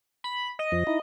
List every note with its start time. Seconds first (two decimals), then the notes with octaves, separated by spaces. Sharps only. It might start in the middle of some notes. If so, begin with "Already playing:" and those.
0.24 B5
0.59 D#5
0.72 F2 F3
0.87 D#4 E4